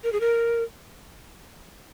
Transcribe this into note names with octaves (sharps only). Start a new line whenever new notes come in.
A#4
G#4
A#4